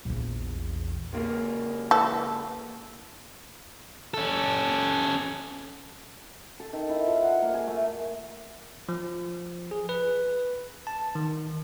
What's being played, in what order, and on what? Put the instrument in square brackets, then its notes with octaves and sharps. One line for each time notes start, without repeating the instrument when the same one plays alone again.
[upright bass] A#1 E2
[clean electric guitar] C#2 A#3
[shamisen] E3 A4
[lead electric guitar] C#4 A4
[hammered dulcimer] A4
D#3
E4
F3
F#5
A#3
G#4
A3
[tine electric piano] F3
G#4
B4
A5
D#3